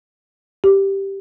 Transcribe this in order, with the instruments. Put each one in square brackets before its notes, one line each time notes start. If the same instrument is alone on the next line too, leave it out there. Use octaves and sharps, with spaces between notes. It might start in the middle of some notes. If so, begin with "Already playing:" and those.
[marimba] G4